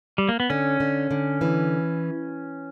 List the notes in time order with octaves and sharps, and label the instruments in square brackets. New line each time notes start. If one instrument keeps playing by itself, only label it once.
[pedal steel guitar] G3
A#3
B3
[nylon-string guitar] D3 [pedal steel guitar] C#4
[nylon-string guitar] D3
D3
E3